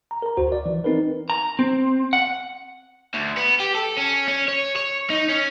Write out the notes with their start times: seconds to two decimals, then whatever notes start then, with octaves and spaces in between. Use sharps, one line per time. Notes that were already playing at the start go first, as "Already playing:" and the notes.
0.11 A#5
0.22 A#4 A#5
0.37 D2 F#4 C5
0.52 D5
0.66 E3
0.84 C4 D#4 A#4 B4
1.30 A#5
1.59 C4
2.13 F#5
3.14 D2
3.37 B3
3.60 G4
3.75 A4
3.98 C#4
4.28 C#4
4.48 C#5
4.76 C#5
5.10 D#4
5.29 C#4